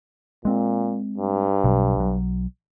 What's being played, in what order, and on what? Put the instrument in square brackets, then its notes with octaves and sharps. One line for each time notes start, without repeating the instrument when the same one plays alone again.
[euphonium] A#2 [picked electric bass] G#3 C4
[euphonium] G2
[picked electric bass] B1 B2 F#3
B1 F#3